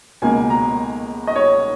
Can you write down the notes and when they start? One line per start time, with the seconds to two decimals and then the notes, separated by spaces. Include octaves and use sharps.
0.22 C#2 B2 A#3 G#5
0.50 A#5
1.27 D#5
1.35 C#5